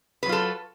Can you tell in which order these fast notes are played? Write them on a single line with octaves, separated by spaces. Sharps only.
B4 F#3 F4 A4